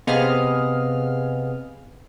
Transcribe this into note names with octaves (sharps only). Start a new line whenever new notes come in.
C3 B3 G#4 D#5 F5 F6